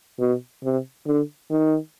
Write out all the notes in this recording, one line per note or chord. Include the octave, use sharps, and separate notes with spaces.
B2
C3
D3
D#3